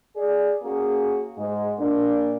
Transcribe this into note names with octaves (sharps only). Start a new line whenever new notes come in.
G#4 D5
A#3 C#4 F#4 G#4
G#2 G#3
A#2 A#3 D4